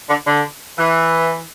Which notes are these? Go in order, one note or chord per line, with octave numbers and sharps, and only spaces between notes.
D3
D3
E3